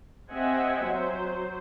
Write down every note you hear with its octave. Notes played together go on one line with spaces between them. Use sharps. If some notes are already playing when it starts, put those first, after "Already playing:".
C4 G4 D#5 E5 F#5 G#5
F#3 C5